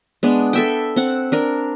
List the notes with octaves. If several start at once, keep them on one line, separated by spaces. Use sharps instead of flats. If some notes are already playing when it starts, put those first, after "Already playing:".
G#3 B3 D4
A4 E5 G5
C4 F#5
D4 A#4